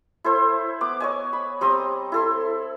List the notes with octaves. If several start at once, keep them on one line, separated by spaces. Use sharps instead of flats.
E4 A4 C5
B3 D6
C#5 D#5 G#5
B5
G3 C4 A#5 D#6
E4 A4 C6